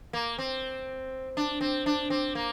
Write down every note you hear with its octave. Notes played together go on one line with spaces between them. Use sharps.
A#3
C4
D4
C4
D4
C4
A#3